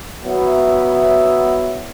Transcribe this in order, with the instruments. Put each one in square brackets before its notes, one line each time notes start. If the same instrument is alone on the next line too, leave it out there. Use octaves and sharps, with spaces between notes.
[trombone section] F#3 B3 E4